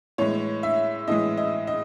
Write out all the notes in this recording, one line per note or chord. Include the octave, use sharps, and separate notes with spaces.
A2 E3 G#3 C#5
E5
A2 E3 G#3 D#5
D#5
D#5